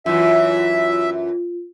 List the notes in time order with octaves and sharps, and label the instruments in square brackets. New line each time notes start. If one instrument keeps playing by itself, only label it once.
[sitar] F#2 E3 [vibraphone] F4 [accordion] E5